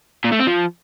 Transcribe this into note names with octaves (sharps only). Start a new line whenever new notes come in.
A#2
A3
C4
F3